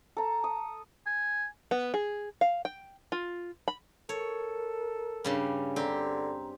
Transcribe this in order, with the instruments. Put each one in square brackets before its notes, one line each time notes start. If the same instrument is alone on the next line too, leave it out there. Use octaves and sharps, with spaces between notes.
[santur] A4 A#5
D#6
[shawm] G#5
[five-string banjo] B3
G#4
F5
G5
F4
B5
[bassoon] A4 [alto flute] A#4 [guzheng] C#5
[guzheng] G2 C#3 G3
[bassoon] D3 [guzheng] C4 G4 [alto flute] A#5